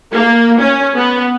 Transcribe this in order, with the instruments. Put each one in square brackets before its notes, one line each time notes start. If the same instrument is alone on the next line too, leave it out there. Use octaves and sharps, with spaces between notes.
[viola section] A#3
C#4
B3